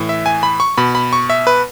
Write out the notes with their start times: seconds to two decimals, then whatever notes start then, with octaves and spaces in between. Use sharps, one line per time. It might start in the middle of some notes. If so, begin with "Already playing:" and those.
Already playing: A2 E3
0.09 E5
0.26 G#5
0.43 B5
0.60 C#6
0.78 B2 B5
0.95 B5
1.13 C#6
1.30 E5
1.47 B4